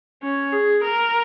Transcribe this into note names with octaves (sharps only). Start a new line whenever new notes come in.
C#4
G#4
A#4